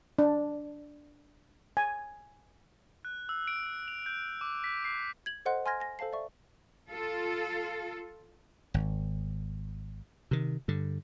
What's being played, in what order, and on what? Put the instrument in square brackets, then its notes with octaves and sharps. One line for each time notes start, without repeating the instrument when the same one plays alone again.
[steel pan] D4
G#5
[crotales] F#6
E6
D7
F7
G6
D6
B6
C7
[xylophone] G#6 F#7
A4 C5 D#5 F#5 C6 F#6
G#5 C6 F6 G#6 A#6
G#5 A#6
A4 C5 F5 A5 C7
D5 E5 C#6
[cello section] F4 A4
[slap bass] G#1
C3 D#3
G2 D3